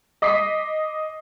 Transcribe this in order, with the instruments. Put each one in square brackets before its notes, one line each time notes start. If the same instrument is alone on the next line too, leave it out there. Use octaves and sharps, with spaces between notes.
[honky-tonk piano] D#5 D6 D#6 B6 C7